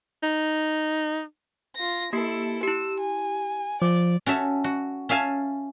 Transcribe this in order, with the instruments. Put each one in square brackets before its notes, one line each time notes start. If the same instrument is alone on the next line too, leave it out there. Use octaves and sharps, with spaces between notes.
[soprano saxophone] D#4
[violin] F4 A#6
[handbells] A#3 G4 C7 [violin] E4 A4
[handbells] E4 G4 [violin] E6
[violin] G#5
[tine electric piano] F3 [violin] D5 [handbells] D6
[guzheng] C#4 F#4 A4 E5
F#4
C#4 E5 F5 G#5 A5